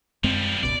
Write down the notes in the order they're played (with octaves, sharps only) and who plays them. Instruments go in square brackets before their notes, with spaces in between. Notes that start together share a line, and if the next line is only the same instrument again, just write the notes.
[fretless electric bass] F#2 G#3 C4 [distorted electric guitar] F3 G3
[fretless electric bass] F#1 C#2 B2 [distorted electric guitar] D5